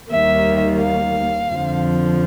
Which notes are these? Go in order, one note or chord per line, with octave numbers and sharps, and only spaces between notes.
D#2 D#3 G3 A#3 E5
F5
F2 D3 F3